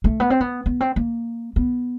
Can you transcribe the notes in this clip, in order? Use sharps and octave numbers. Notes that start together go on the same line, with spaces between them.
A3
B3
C4
B3
B3
C4
A#3
B3